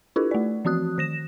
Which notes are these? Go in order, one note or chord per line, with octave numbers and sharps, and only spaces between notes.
D4 E4 F4 G4 A4 B4
A3 D5
E3 F3 C4 F#4 D#6 F#6
D#3 A#6 E7